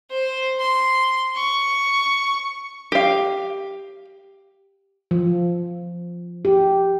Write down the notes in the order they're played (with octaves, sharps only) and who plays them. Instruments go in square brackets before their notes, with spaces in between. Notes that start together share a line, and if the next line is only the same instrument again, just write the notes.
[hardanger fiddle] C5
C6
C#6
[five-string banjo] G4 F5
[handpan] F3
G4